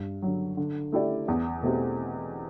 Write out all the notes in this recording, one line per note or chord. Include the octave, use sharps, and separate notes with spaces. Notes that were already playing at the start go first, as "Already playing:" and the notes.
Already playing: G2
D3 F#3
D3
A3 E4 G4 D5
E2
B2 A3 C4 G4